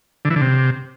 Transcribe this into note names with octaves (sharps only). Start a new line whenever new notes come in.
D3
E3
D3
C3